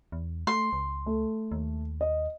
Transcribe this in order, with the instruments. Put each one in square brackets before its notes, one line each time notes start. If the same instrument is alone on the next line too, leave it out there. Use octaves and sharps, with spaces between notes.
[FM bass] E2
[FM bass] A3 [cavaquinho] C6
[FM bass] C#2
[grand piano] A3
[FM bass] D#2
[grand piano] D#5